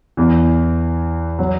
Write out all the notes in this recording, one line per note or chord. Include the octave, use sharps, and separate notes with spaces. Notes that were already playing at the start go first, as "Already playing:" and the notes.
E2 E3
F#3